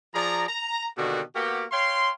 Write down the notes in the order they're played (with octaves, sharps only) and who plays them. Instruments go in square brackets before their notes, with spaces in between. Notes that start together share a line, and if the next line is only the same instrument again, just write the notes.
[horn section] F3 G#4 D5 A#5
A#5
B2 D3 D#3 A#3 F#4 G4
A#3 B3 F#4 G4
C#5 F5 G5 C6